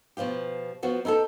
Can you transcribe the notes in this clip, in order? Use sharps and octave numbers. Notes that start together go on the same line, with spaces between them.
B2 F3 F4 G4
F3 B3 F#4
D#4 E4 G4 A4